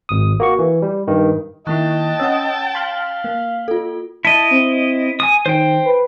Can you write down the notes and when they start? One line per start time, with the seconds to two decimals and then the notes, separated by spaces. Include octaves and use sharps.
0.09 G#1 D#6
0.40 A#3 F#4 C#6
0.59 E3
0.82 G3
1.08 G2 D#3
1.67 D#3 A#3 E4 D#5 G5 A5 C#6 F#6
2.20 C#4 C#5 F#5 E6
2.75 F5 C6 F6 B6 F#7 G7
3.24 A#3
3.68 F4 A4
4.25 E4 D#5 A5
4.51 C4
5.20 G#5 D#6
5.46 D#3 C5 G5
5.85 B4